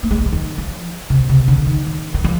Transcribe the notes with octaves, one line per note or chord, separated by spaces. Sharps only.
A#3
G#3
G3
F3
D#3
F3
C3
C3
D3
D#3
D#3
D#3
F3